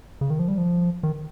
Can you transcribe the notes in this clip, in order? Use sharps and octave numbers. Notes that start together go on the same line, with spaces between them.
C#3
D#3
F3
G3
F3
D#3